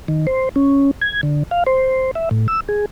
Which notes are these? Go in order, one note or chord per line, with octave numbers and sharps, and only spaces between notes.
D#3
C5
C#4
G#6
D3
F5
C5
E5
A2
E6
G#4